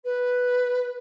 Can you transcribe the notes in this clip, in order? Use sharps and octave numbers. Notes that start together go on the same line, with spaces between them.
B4